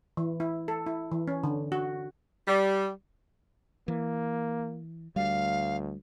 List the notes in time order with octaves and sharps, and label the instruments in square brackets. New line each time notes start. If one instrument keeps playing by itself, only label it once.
[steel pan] E3
E4
A4
E4
E3
C#4
D3
F#4
[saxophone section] G3
[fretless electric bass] E3 [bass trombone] A#3
[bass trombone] D2 [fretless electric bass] G3 [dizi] F5